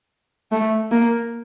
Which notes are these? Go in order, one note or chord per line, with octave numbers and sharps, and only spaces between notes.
A3
A#3